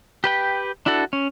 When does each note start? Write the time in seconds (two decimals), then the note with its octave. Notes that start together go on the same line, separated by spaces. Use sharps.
0.24 G4 B4 G5
0.86 D4 E4 F#4 A4
1.13 C#4